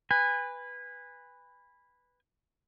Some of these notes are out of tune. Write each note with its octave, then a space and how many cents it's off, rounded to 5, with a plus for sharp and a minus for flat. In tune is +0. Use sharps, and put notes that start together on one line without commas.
B4 +0 G#5 -30